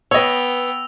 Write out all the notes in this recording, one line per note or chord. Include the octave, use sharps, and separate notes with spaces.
B3 B4 C#5 D#5 F#5 G5 E6 F7